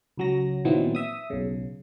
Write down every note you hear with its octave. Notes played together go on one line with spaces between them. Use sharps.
C#2 F#3 A#6
A#2 D#3 E3 F#3 B3 C4
E5 D#6
B1 C#3